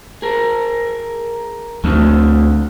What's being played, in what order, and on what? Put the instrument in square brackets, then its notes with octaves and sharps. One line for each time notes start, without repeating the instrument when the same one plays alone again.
[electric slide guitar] G#4 A#4
[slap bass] D2 [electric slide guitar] A3 C4